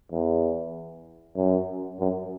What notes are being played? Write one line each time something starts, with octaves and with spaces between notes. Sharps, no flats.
E2
F#2
F#2